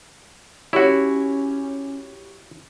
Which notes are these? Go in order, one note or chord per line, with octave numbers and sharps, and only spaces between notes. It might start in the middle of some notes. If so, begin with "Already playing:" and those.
C#4 E4 F#4 G4 C#5